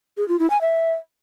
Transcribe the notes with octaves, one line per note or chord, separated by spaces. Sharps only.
G#4
F4
E4
G#5
E5